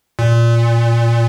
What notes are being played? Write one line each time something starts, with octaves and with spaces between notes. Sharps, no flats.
A#2